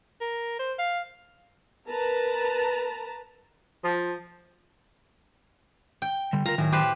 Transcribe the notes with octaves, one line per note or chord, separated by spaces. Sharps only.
A#4
C5
F5
A#4 B4 A5 A#5
F3
G5
D3 G3
F4 A#4 A#5
A2 D#3 F#3 G#5
G4 B4 C5